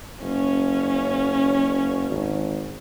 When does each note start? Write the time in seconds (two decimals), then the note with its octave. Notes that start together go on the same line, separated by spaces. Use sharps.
0.21 F#1 C#4
2.10 G#1